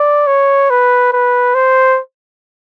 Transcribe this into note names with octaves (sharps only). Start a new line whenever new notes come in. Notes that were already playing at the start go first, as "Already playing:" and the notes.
Already playing: D5
C#5
B4
B4
C5